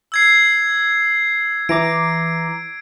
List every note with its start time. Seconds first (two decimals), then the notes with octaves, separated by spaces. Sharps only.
0.12 E6 G#6 C7
1.69 E3 A#5 D6 D7